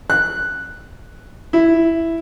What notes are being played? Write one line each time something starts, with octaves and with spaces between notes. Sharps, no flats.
F#6
E4